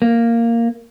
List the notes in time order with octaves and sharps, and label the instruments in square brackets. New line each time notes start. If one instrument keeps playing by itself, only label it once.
[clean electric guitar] A#3